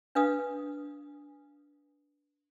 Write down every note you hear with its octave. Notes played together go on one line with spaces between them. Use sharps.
D4 B4 F5 D#6